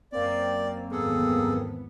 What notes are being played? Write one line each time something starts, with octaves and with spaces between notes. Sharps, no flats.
F#2 A#3 C4 D5
G#1 E2 B3 G#4 A4